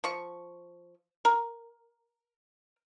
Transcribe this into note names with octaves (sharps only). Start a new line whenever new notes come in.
F3 C#6
A#4